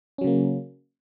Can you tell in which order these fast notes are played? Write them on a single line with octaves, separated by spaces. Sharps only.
C#4 F#3 C#3 A#3